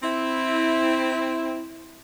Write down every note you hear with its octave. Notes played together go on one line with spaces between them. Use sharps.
C4 E4